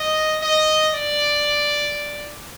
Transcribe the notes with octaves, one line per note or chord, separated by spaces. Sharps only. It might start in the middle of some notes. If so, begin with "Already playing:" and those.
Already playing: D#5
D#5
D5